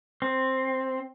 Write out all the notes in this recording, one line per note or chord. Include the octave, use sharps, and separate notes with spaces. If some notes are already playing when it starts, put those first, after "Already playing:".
C4